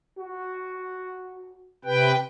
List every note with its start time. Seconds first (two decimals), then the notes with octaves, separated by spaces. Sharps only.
0.18 F#4
1.85 C3 B4 G5